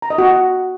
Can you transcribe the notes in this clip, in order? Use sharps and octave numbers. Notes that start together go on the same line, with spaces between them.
A#5
D#5
F#4